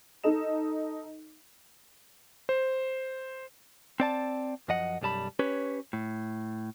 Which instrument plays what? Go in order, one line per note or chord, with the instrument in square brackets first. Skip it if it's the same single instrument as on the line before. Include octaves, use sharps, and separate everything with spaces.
[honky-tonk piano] D#4 A4 D#5 E7
[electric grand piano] C5
[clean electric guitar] C4 D5 A5
F#2 F3 D#5 F#5
B1 F#2 G3 A5 B5
C#4 G4 B4 C#5
A2